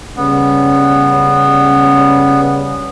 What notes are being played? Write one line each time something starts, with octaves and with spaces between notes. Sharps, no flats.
C#3 G3 B3 C#4